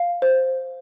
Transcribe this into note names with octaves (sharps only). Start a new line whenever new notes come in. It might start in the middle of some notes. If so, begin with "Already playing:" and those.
Already playing: F5
C5